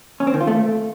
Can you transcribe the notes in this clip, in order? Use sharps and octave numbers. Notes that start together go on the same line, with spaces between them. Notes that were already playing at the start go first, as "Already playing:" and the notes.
C#4
C4
D#3
F4
A3